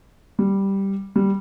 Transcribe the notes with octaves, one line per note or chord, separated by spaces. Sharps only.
G3
G3